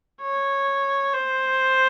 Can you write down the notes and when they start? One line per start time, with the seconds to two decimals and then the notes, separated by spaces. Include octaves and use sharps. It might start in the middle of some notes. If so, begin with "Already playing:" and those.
0.21 C#5
1.13 C5